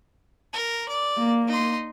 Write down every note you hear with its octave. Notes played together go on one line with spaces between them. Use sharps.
A#4
D5
A#3
D#4 C6